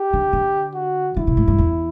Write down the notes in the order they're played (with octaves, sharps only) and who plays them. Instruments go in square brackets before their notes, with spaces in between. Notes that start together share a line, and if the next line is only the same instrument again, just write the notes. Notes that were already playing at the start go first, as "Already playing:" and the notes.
Already playing: [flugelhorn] G4
[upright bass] D3
D3
[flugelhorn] F#4
[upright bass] D3 [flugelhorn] E4
[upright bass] C3
A2
G2
E2